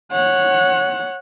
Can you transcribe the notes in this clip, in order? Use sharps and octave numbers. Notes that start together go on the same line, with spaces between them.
C#5 F#5